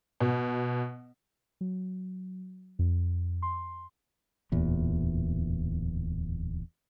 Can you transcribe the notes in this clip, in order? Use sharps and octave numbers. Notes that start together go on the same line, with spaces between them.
B2
F#3
F2
C6
D1 E2 A#2